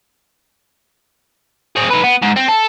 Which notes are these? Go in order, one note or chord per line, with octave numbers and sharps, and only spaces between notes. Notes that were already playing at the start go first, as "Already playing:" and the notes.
C4 G#4
D#4 B4
B3
G#2
C4
A4